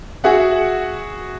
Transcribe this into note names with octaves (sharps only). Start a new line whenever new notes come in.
F#4 G#4 E5 F#5